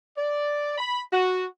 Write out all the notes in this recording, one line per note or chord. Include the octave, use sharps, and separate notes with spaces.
D5
B5
F#4